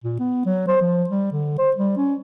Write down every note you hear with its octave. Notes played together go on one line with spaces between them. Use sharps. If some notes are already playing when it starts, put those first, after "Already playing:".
A#2
B3
F#3
C5
F3
G3
D3
C5
G3
C#4